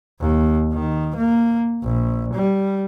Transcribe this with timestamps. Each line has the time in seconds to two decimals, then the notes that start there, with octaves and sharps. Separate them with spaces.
0.20 D#2
0.73 D#3
1.16 A#3
1.83 A#1
2.34 G3